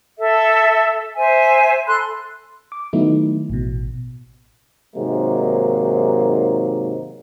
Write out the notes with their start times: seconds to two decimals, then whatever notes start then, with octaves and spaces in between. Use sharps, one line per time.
0.19 A4 E5
1.16 C5 E5 G#5
1.87 A4 B5 C6 F#6
2.72 D6
2.93 D#3 F#3 A3 B3 D#4 E4
3.50 A1 B2
4.96 G#2 C3 D#3 F#3 G#3 A#3